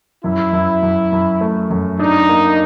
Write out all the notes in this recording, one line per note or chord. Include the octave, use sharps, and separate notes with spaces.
F#2 E4
F#2
F#2
F#2
A3
F#2
D4 D#4
A#3